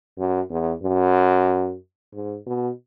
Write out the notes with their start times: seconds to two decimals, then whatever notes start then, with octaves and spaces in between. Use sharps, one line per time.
0.18 F#2
0.50 E2
0.83 F#2
2.14 G#2
2.46 B2